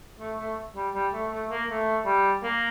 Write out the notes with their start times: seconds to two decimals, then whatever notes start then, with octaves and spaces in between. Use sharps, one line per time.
0.19 A3
0.38 A3
0.76 G3
0.94 G3
1.12 A3
1.31 A3
1.49 A#3
1.69 A3
2.05 G3
2.43 A#3